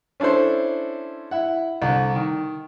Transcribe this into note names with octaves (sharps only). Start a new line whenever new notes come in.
C#4 D4 E4 A4 C5
E4 E5 F#5
C2 D3
D#3